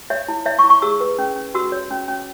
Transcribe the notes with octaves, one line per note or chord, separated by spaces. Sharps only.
C#5 E5
E4
C#5 E5
C#6
E4
C#6
G#4 E6
B4
C#4
C#4
F#4 E6
C#5
C#4
C#4